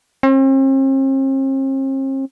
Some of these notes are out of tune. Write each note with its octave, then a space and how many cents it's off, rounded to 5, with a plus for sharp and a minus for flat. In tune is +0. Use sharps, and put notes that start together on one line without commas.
C4 +45